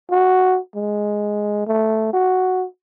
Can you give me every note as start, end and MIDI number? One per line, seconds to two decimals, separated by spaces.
0.11 0.58 66
0.75 1.64 56
1.67 2.13 57
2.13 2.65 66